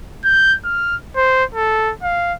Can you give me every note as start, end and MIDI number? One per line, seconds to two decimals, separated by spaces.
0.24 0.55 91
0.65 0.96 89
1.16 1.44 72
1.55 1.92 69
2.03 2.33 77